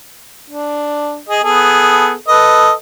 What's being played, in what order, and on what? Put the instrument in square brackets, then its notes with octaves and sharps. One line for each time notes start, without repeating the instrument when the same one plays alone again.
[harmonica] D4
G#4 D#5
B3 G#4 A4
A4 B4 D#5